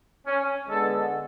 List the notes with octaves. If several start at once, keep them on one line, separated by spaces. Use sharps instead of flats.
C#4
D3 G#3 B3 A4